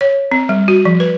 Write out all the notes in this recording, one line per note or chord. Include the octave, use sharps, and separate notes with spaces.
C#5
C4
G3
F#4
F3
B4